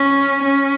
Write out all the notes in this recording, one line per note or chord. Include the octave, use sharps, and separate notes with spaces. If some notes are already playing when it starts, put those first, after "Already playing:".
Already playing: C#4
C#4